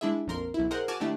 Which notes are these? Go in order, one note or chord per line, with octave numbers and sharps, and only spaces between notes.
G#3 D4 E4 G#4 E5
A#1 F2 A#4 C6
B1 E4
G#4 A#4 C5 D#5 F#5
F#4 G#5 A5 D6 F6
D#3 A3 D4 E4 G4